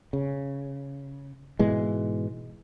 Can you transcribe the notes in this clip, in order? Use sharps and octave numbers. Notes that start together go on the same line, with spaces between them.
C#3
G#2 B2 E3 G#3